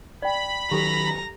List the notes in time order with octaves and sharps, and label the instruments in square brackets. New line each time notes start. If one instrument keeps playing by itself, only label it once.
[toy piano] D5 G5 [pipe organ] B5
[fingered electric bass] D#3 F#3 [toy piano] G4 A4 [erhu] A#5